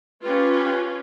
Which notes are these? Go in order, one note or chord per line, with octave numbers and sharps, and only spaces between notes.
C#4 F4 G4 B4